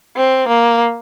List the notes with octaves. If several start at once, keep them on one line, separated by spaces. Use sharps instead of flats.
C4
A#3